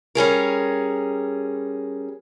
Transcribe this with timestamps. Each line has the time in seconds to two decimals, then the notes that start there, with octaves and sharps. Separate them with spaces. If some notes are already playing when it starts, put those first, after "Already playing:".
0.15 G3 C#4 G#4 A#4